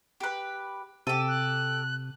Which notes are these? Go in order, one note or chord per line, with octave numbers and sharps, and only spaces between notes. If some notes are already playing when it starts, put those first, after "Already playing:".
G4 B4
C3 G4 A4 D#7
F#6